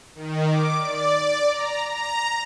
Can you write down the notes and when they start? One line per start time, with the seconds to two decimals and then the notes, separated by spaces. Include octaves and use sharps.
0.15 D#3
0.47 D6
0.78 D5
1.49 A#5
1.91 A#5